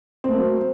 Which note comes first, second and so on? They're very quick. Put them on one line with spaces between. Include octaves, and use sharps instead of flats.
C4 A3 A#3 F#3